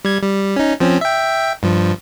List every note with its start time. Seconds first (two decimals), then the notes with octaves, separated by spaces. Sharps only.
0.05 G3 G#6
0.23 G3
0.56 C#4 D#4
0.80 F3 C4 C#4
1.01 E5 G5
1.63 G2 F3